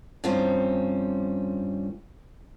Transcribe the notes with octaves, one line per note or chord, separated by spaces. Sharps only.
G2 D#3 F3 G3 C4 C#4